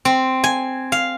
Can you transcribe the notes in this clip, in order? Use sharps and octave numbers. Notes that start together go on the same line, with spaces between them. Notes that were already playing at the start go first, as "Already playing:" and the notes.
C4
G#5
F5